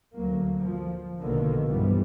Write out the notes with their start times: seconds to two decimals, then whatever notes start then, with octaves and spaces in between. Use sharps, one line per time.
0.15 D2 F#3 A#3
0.61 F3
1.21 A#1 B2 D3 D#3 A#3
1.68 B1 G2 E3 F3 G3 B3